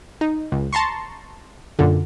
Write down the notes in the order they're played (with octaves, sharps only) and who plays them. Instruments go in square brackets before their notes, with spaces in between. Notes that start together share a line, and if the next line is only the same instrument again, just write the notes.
[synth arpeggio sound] D#4
C#2
A5 A#5 C6 C#6
F#2 A#2 D3